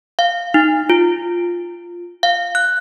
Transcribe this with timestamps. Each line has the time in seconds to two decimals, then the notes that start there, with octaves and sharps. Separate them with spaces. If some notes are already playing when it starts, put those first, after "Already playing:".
0.19 F5
0.54 D#4
0.90 F4
2.23 F5
2.55 F#6